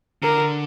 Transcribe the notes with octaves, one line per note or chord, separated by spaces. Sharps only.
D3 A#4